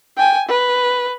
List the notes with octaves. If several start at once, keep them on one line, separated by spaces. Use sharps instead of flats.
G5 G#5
B4